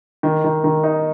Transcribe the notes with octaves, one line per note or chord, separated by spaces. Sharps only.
D#3
D#3
D#3
D#4